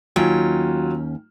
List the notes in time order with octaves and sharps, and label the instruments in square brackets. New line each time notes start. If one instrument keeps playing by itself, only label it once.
[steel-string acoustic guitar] D#2 C#4 G5 [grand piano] F#3 F4